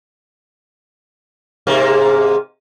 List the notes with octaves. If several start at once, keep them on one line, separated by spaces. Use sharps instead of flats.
G#2 C3 A#3